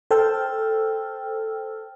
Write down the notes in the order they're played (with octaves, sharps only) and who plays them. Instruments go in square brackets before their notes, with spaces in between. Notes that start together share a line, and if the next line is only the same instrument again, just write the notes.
[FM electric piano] A4 C5 G5 A5 E6 F6